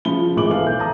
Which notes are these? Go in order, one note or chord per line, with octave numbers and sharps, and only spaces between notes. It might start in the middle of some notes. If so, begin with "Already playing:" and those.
C#3 F3 B5 G7
G#1 A2 G#4 D6 F#7
E3 A4 F5 F#7
B1 G6
A5 A#5 D#6